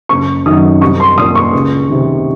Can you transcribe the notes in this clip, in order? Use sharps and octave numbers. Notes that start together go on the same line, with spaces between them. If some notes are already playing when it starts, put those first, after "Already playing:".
F#1 C#6
F#2 D#3 D#6
C2 C#6
C6
A#2 D#6
C#6
C#2
C3 D#3